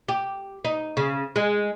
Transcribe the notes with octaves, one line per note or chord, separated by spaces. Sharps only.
G4
D#4
C#3
G#3